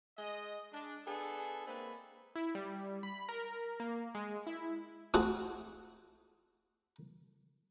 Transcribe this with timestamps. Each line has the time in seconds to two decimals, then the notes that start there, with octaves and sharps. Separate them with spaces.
0.18 G#3 D#5
0.72 G#3 D4
1.07 B3 D4 G#4 A4
1.67 G#3 A#3 C4 B4
2.35 E4
2.55 G3
3.03 B5
3.29 A#4
3.80 A#3
4.15 G#3
4.47 E4
5.14 A3 C4 F4 F#4 G#4